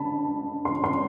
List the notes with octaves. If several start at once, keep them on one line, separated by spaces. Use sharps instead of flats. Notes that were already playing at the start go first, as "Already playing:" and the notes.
Already playing: D3 A5 B5
C6
C6